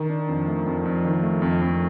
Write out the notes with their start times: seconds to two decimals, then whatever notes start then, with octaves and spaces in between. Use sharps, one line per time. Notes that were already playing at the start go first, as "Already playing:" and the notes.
Already playing: D#3
0.10 D4
0.29 F2
0.48 A3
0.66 F2
0.85 F2
1.05 D#3
1.23 A3
1.42 F2
1.61 F2